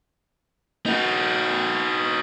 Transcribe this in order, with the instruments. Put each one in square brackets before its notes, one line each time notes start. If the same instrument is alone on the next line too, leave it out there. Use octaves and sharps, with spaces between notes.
[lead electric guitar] D#4 F#4